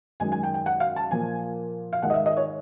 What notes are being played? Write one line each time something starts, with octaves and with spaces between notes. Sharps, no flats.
F#2 D#3 G#3 G#5
G#5
G5
G5
F#5
F5
A5
A#2 F3 A#3 G#5
F5
G#2 D#3 G#3 F#5
D#5
E5
D#5
C#5